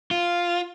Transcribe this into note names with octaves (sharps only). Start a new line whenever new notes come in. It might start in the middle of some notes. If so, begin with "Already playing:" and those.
F4